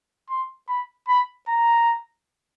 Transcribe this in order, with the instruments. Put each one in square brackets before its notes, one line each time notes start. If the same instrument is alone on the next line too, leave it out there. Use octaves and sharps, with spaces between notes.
[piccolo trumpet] C6
B5
B5
A#5